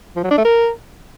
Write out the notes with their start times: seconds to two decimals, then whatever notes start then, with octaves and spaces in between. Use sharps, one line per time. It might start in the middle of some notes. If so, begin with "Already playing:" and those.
0.16 F3
0.24 F#3
0.31 D4
0.38 A3
0.45 A#4